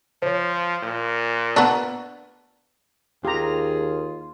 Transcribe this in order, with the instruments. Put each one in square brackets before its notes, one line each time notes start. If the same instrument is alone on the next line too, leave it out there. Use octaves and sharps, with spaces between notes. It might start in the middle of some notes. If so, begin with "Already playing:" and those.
[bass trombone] F3 [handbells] C5 C#5
[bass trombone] A#2
[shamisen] B3 D4 [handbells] A#5 C#6 E6
[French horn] D#2 [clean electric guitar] F4 [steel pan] G4 A#5 [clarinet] G#4